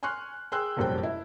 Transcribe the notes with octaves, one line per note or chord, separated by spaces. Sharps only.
G#5 C6 C#6 F6 F#6
G#4 G5 C6 E6 F#6
F1 A#1 F#2 G3 C5 G5
E4